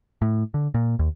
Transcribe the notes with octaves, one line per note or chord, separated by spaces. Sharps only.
A2
D3
A#2
D#2